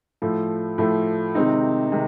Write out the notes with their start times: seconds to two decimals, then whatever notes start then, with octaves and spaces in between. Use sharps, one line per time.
0.22 A2 F3 A3
0.78 A2 F3 A3
1.35 C3 D#3 G#3 C4 D#4
1.92 C3 D#3 G#3